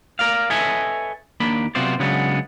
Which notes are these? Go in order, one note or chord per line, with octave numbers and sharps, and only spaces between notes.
A#4 D5 F5
A4 B4 C#5 D#5 E5 G#5
D#2 A#3 D4 B5
C3 F#3 B3 F4 C5 D5
C#3 F#3 G#3 B3 D4